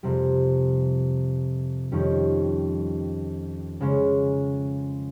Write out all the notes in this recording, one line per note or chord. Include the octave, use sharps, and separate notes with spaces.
F2 C3 G3
F2 D#3 G3 C#4
C#3 G#3 C#4